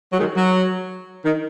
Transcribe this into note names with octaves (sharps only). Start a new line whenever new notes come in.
F#3
D#3 G#3
F#3
D#3